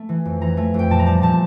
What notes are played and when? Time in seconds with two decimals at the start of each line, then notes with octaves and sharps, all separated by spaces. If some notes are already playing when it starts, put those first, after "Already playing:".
Already playing: A3
0.09 E3
0.25 F2
0.41 E3 A#5
0.57 A3
0.74 F2
0.79 G5
0.90 A#2 A5
0.99 A#5
1.06 G3 A5
1.22 A#2 A5